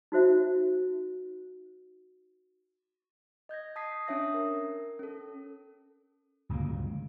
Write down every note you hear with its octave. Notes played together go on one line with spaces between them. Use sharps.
D#4 F#4 C5 E5
D#5 G6 G#6 A#6
A5 D#6 G#6 B6 C7
C#4 D4 C#5 E5 D#6 A#6
A#4
C#4 A4
D1 C#2 G2 A#3